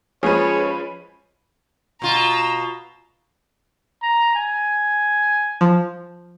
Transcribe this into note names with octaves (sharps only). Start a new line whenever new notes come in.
F3 G#3 C#4 G#4 B4 C#5
B2 F4 A#5 E6
A#5
G#5
F3